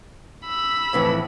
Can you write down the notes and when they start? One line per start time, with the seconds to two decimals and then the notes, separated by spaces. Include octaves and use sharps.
0.47 B5 E6
0.93 F2 A2 E3